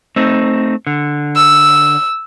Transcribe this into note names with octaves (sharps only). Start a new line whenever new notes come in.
A3 C4 D#4
D3
E6